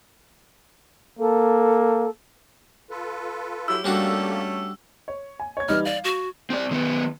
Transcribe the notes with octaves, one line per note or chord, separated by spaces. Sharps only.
A#3 A4
F4 A4 B4
F#3 E4 G4 E6
G3 A3 A#3 C#4 D4 F#4 G4 A4
C#5
G#5
C#5 G#6
E3 G3 D#4 F6
D5 F5
F#4
C4 D5
D#3 B3